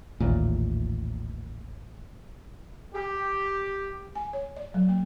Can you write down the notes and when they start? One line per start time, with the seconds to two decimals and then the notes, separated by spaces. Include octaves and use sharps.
0.20 A1 D#2 A#2
2.94 G4
4.15 G#5
4.33 C#5
4.57 D5
4.74 F#3
4.89 A#3